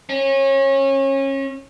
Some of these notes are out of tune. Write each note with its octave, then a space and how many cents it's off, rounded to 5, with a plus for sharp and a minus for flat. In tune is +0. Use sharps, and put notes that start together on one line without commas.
C#4 -30